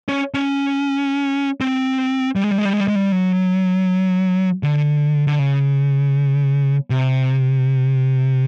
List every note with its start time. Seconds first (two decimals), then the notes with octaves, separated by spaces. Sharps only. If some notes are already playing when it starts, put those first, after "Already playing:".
0.09 C#4
0.34 C#4
1.61 C4
2.36 G3
2.44 G#3
2.51 G3
2.58 G#3
2.65 G3
2.73 G#3
2.80 G3
2.88 G#3
2.95 G3
3.12 F#3
4.63 D3
5.27 D3
5.39 C#3
6.90 C3